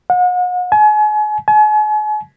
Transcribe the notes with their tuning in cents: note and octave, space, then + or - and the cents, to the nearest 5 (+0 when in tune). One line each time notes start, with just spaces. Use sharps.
F#5 -40
G#5 +35
G#5 +40